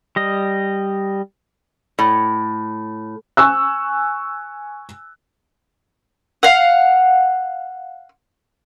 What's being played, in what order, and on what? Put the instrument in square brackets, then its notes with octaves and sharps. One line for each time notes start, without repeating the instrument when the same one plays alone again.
[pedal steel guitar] G3 D#5
[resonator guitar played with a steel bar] A2
[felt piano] G#5 C#6 E6 F#6
[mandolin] F5 F#5